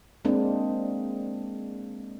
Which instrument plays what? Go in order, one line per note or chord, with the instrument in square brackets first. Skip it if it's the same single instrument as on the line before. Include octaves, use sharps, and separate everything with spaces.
[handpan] G#3 A#3 C4 D4